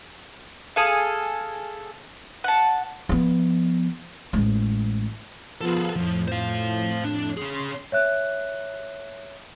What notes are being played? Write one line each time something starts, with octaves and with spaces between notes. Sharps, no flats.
G#4 A4 F5
F#5 A5
F3 B3
A1 G#3
F3 B3 F4 G#4 A4
F2 A2 F3
C5 F5
D4
C#4 G#4 C6
C#5 E5 F#6